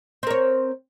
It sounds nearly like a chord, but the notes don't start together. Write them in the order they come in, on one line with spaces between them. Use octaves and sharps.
C4 A#4 C#5